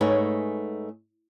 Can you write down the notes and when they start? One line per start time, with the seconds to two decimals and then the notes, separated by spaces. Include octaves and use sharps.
0.01 G#2 A3 D#4 B4 C#5 G#5